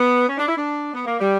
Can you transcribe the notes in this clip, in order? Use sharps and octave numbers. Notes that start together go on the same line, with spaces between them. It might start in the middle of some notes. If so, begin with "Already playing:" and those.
Already playing: B3
C#4
D4
E4
D4
B3
A#3
G3